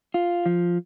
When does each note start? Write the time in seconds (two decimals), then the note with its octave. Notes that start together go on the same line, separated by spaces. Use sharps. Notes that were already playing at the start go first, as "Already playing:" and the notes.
0.14 F4
0.46 F3